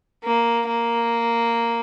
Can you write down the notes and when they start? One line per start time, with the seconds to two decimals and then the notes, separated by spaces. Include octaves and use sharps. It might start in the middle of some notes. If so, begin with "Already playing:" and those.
0.24 A#3
0.67 A#3